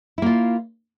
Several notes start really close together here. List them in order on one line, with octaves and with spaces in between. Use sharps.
E4 A#3 F4